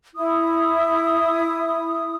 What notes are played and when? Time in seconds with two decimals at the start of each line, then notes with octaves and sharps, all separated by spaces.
0.16 E4 D#6